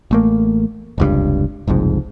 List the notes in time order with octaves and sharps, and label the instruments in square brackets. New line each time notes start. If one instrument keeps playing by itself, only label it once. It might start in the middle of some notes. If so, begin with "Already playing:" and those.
[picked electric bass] A1 A3 A#3
F1 C#2 G2
F#1 C2 F2 G#2